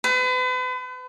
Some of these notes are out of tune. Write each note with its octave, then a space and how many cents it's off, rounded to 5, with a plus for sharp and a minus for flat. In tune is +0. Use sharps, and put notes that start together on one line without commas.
B4 +40